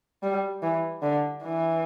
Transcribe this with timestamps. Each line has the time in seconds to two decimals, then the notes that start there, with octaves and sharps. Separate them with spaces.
0.23 G3
0.63 E3
1.02 D3
1.43 E3